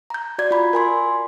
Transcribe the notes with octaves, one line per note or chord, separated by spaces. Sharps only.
A#5 G6
F#4 D5 G#6
F4 B5
A#4 G#5 C6